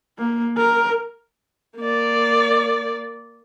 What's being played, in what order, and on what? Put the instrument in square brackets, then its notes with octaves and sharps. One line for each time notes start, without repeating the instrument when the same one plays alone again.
[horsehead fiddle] A#3
A#4
[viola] A#3 D5